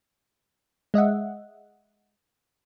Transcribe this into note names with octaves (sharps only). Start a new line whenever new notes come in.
G#3 D#5 E5 F#5